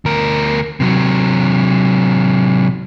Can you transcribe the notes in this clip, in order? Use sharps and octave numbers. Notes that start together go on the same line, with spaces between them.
D2 A#4
C3 F#3